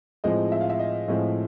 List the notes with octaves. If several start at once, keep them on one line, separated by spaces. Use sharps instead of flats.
A2 F3 G#3 C4 D#5
E5
F5
E5
D#5
A2 F3 G#3 C4 D#5